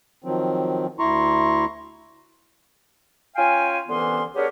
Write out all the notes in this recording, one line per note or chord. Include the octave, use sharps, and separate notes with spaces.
D#3 F3 F#3 C4
D2 E4 A#5 C6 C#6
C#4 F4 F5 G5 G#5
C2 D3 E3 B3 C#4 C6
B3 D4 G4 G#4 A#4 C#5